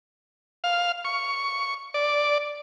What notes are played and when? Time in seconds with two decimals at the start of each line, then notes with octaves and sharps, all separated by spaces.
0.64 F5
1.05 C#6
1.94 D5